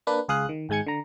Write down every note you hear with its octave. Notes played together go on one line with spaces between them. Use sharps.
A#3 D4 B4
C#2 G#4 F5 D#6 F#6
D#3
G#1 G#2 G#3 G#5 G#6 C#7
D3 A#5